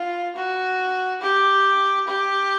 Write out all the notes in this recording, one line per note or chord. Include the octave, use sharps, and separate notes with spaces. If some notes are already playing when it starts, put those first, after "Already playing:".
Already playing: F4
F#4
G4
G4